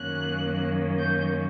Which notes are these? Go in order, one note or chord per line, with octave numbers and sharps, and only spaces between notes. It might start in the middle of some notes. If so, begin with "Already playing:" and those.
Already playing: F#2 D#3 F#3 A#3 C#4 F#6
G6